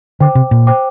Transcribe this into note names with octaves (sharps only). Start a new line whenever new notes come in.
D3 C5 G5 D6
C3
A#2
C5 G5 D6